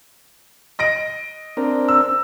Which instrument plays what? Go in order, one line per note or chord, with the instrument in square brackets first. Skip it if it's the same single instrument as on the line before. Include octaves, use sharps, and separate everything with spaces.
[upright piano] D#5 A#6 D7
[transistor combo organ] C4 D4 A#4
[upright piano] E6